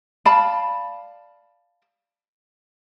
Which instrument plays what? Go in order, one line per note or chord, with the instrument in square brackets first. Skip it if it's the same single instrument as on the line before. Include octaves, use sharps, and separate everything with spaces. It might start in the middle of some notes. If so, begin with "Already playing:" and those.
[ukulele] D5 F5 A5 B5